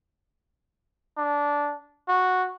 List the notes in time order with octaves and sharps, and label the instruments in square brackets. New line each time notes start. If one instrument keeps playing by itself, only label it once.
[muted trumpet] D4
F#4